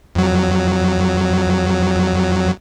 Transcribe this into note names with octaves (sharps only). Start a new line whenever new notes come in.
F2 F#3